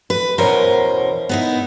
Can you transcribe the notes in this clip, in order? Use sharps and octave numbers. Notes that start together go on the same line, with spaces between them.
B4
E2 B2 C#4 A#4 C5
B3 D#4 E4